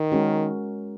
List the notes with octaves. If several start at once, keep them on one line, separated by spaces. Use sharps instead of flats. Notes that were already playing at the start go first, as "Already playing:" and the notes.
Already playing: D#3
G#3 C#4 F#4 A#4